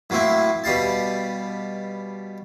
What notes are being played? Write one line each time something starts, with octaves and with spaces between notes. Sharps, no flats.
A2 F#3 A#3 C4 E4
B2 G3 F5 A5